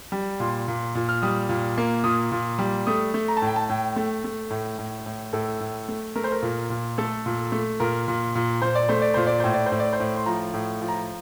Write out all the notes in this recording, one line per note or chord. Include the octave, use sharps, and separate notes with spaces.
G3
A#2 C6
A#2
A#2
F6
G3 D#6
A#2
A#3
A#2 D#6
A#2
G3
A3 D#6
A3
A#5
A5
A2 G5
A5
A2 G5
A3
A3
A2
A2
A2
A2 A4
A2
A3
A3 A#4
C5
A#4
A#2
A#2
A3 A4
A#2
A3
A#2 A#4
A#2
A#2
A#2 C5
D5
A3 C5
D5
A#2 C5
D5
A2 C5
D5
C5
A2
D5
C5
A2
C6
F3 A#5
A2
F3
A#5